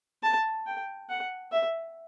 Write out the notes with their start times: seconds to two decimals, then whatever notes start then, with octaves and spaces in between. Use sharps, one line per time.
0.23 A5
0.67 G5
1.10 F#5
1.52 E5